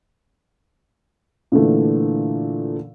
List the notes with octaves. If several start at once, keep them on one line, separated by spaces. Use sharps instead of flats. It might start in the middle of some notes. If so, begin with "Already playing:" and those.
A#2 D3 E3 A3